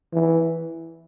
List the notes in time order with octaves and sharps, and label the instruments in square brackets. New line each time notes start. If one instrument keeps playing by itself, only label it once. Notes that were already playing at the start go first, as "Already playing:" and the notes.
[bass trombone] E3